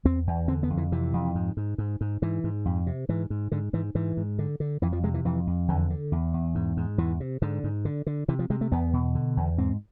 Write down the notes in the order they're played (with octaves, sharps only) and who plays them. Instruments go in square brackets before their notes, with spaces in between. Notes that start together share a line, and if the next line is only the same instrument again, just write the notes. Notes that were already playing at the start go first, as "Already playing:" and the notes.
[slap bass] E2 C4
E2
D3 C4
B3
F2
E3
C3 E3
F2
G#2
G#2
G#2
G#2
G#2 E3
G#2
F2
C3
G#2 E3
G#2
G#2 D3
G#2 E3
G#2 E3
G#2
D3
D3
F2 E3
F3
C3 G#3
E3
F2 E3
F2
E2 D3
D3
E2
E2
G#2
G#2
E2 E3
C3
G#2 D3
G#2
D3
D3
C3 E3
F3
C3 G#3
A3
E2 B3
B2
D3
E2
G#2 C4